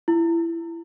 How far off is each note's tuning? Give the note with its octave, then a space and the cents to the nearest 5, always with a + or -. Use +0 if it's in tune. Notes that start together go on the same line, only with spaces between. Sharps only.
E4 +20